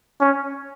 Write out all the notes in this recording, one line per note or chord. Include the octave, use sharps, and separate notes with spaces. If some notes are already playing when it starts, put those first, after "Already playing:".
C#4